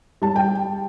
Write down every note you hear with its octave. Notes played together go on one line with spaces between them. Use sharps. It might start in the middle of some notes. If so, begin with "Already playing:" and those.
G3 A5
G5